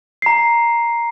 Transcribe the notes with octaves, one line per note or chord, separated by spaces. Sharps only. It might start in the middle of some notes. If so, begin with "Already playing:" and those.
A#5 C7